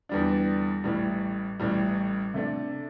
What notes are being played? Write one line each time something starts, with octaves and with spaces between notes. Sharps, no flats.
E2 D3 G3 D4
A1 A2 G3
A1 A2 G3
C3 A3 D4